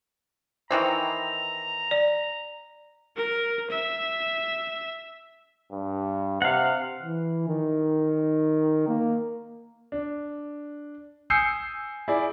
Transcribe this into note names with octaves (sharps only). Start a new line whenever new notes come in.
D#3 E3 C4 A#5
D5
A#4
E5
G2
C3 F5 F#5
E3
D#3
A#3
D4
G#5 D#6 E6 G6 C7 C#7
E4 G#4 D5